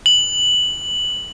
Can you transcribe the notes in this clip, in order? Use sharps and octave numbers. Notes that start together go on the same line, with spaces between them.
F#7